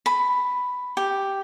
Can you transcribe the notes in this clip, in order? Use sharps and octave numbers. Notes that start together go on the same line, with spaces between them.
B5
G4